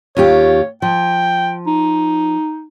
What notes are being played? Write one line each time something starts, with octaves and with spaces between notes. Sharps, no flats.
D#2 F4 G4 C#5
F3 G5
D#4